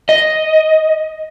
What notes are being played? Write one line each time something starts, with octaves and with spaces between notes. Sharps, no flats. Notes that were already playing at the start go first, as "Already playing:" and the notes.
D#5